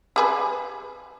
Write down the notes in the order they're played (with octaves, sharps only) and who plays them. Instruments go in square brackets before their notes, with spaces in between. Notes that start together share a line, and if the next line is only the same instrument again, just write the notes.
[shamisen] G4 G#4 B4